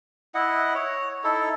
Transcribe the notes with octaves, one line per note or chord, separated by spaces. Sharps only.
E4 D#5 F#5
C#5
D#4 E4 A4